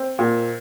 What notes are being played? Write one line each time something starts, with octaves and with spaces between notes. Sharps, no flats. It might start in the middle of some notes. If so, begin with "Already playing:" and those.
Already playing: C4
A#2